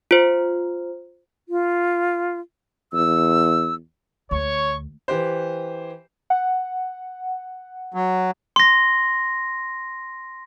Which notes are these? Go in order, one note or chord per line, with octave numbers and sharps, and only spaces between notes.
F4 C5
F4
E2 E6
D2 C#5 C#6
E3 G4 C5
F#5
F#3
C6 A#6